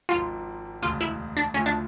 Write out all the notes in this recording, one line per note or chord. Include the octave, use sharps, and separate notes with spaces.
G#1 G#2 F3 F4
E1 D2 C#3 F4
E4
D4
D2 C#3 F3 A3 C#4
D4